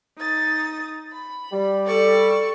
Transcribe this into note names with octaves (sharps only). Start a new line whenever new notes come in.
D#4 D#6 A6
B5
G3
A4 D5 C#6